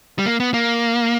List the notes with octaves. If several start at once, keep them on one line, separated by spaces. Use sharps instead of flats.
G3
A#3
B3
A#3